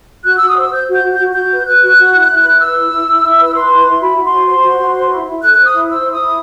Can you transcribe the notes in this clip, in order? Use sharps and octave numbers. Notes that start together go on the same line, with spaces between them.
F#4 F#6
F#4 E6
D#6
C5 E6
C5 G6
F#4 G6
F#4
G6
F#4
F#4 G6
B4
B4 F#6
F#4
F#4
E4
E4
B4
B4 E6
E4
E4
E4
E4
B4
B4 C6
E4
E4
F#4 B5
F#4
C6
C5
C5 C6
F#4
F#4
C5
E4
E4
A4 F#6
C5 F#6
D#6
E4
C5 E6
E4
D#6
E4